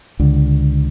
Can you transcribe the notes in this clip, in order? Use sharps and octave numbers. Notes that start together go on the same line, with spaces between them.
C#2 D3